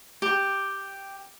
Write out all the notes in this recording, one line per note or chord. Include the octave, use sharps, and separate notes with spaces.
G4